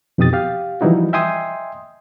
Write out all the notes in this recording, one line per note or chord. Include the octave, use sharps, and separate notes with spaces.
F2 B2 D#4 G4 D#6 A6
G4 F5
E3 F3 G3 D#4 E4 F#4
D#5 E5 G5 G#5 C6 D#6